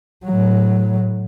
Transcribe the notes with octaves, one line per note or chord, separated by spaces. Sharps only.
A2 F#3